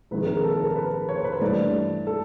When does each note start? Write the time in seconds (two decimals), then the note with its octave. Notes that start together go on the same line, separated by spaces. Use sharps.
0.11 A#1 G#2 D#3 G#3 C4 B4
0.27 A#4
0.44 A4
0.60 A#4
0.76 B4
1.09 C#5
1.16 C5
1.24 B4
1.32 C5
1.41 G2 E3 A3 D4 D5
2.07 A4